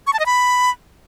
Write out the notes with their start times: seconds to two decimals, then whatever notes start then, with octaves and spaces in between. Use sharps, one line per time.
0.07 C#6
0.13 A5
0.19 D#5
0.26 B5